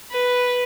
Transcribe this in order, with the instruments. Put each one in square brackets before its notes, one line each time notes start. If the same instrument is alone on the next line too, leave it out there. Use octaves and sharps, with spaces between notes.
[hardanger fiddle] B4